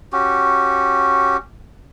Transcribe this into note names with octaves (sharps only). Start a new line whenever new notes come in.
C#4 F#4 G4